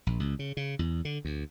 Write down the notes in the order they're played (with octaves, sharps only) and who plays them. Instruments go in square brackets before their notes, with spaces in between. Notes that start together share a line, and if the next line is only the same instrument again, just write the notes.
[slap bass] A#1
C#2
C#3
C#3
E2
D3
D2